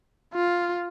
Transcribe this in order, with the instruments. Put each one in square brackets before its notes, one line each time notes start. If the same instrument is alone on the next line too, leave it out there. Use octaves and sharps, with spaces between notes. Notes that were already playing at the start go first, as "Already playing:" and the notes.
[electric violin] F4